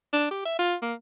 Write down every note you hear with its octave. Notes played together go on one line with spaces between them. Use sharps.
D4
G4
E5
F4
A#3